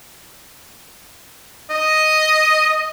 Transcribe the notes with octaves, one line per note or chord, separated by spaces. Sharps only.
D#5